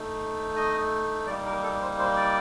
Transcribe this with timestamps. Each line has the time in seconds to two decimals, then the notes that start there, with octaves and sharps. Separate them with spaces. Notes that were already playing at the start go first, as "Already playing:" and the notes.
Already playing: A3 D#4
0.56 D#5
1.27 G3 A#3 D#4 D5
1.46 A#4
1.63 A4
1.81 C5
1.99 C5
2.16 D5